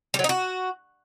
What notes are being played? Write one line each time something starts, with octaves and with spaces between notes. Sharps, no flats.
G3
F#3
D#4
F#4